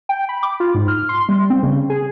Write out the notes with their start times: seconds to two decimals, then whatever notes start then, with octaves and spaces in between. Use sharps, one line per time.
0.09 G5
0.29 B5
0.43 D6
0.60 F4
0.75 G#2
0.88 F6
1.09 C6
1.29 G3
1.50 C4
1.63 C#3
1.90 G#4